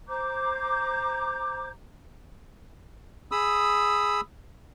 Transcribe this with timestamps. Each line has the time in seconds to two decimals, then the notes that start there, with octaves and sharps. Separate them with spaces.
0.07 C5 A#5 D6 G6
3.32 G#4 B5 D#6 E6